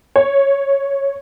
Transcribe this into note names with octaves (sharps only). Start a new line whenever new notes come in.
C#5